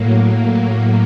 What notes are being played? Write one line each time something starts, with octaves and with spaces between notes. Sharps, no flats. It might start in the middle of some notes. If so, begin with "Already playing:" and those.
Already playing: A2 F#3 A#3